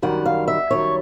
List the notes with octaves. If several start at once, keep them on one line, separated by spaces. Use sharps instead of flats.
F#2 D#3 G3 F#5
F5
E5
F#2 D#3 G3 C#5